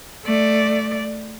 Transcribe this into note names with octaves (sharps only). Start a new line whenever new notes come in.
A3 D5